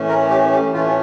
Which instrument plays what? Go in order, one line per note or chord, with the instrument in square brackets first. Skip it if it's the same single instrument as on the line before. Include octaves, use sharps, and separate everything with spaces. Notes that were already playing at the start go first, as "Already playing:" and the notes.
Already playing: [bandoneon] A2 E3 A3 C#4
A#4
G4
G4
A2 E3 A3 C#4 F4